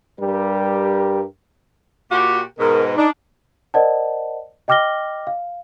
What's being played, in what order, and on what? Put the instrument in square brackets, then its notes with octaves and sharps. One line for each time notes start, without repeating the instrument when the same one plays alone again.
[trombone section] G2 G3 G4 A#4
[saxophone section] A#2 F#4 G4
[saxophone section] G#2 B2 [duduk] A#4
[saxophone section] D4 [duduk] D#4
[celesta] A#4 C5 D5 D#5 F#5 A5
D#5 G5 D6 F6 A#6 G7
F5